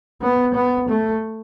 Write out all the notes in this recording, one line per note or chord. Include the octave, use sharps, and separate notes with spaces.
B3
B3
A3